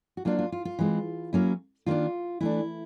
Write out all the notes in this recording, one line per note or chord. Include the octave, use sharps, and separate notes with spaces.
F#4
F#3 A#3 D4 F4
F4
F4
F4
E3 G#3 C4
F#3 A#3 C#4 E4
D#3 G3 A#3 D4 F4
E3 A3 D4 E4